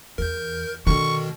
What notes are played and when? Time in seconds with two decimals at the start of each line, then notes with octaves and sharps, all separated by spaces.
0.18 E2 A#4 G6
0.86 B2 D3 D#3 C#6